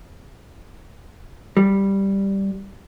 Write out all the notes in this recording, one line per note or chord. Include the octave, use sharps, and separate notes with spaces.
G3